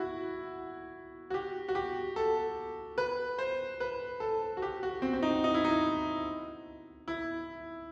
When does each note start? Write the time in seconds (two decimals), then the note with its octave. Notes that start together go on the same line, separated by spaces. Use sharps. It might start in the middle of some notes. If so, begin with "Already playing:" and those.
Already playing: E4 F#4
1.30 F#4
1.34 G4
1.68 F#4
1.75 G4
2.16 A4
2.98 B4
3.38 C5
3.80 B4
4.20 A4
4.57 F#4
4.62 G4
4.83 F#4
5.02 C4
5.13 C4
5.22 D#4
5.44 D#4
5.54 E4
5.65 D#4
7.08 E4